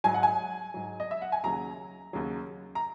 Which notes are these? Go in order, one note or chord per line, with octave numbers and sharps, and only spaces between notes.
G#2 F#3 G#5
F#5
G#5
G#2 F#3
D#5
E5
F#5
G#5
D#2 C#3 F#3 A#5
D#2 C#3 F#3
A#5